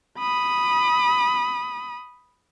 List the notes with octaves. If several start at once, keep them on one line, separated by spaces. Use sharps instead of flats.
B5 D#6